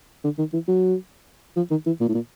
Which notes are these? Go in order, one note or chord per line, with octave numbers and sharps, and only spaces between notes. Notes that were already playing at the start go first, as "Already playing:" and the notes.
D3
D#3
E3
F#3
F3
D#3
E3
A#2
A2
A#2